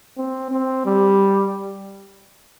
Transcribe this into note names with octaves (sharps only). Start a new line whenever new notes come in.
C4
C4
G3